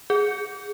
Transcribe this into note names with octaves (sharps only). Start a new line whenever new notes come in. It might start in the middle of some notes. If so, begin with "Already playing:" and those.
G#4